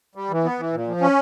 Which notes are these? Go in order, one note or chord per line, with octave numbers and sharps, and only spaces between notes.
G3
E3
B3
E3
A#2
F3
C#4